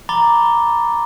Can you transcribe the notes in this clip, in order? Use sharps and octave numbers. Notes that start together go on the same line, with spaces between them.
A#5 B5 D6 A6 G7